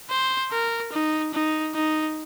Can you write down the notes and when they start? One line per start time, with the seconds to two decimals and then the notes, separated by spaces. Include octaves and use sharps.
0.10 C5
0.52 A#4
0.93 D#4
1.34 D#4
1.75 D#4